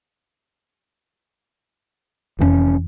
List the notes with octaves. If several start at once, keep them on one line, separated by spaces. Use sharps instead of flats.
F1 F2 G#2 E3 C#4